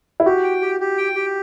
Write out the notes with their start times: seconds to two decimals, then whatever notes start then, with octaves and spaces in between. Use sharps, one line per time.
0.20 E4
0.26 F#4 G4
0.44 G5
0.62 G4
0.80 G4
0.98 G5
1.15 G4